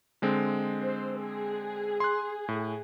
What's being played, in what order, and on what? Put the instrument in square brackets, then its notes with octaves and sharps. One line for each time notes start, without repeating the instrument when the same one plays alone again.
[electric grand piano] D3 G#3 C4
[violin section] C5
G#4
[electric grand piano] C6 F#6
A2